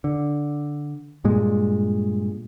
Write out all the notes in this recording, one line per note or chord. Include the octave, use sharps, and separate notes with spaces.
D3
G2 A#2 G#3